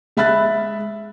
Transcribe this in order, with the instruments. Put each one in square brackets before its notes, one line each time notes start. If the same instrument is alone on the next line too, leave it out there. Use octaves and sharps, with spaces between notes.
[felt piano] G#3 E5 B5 F#6 A6